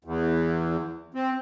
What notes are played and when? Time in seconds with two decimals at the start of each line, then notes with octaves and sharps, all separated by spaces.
0.04 E2
1.14 C4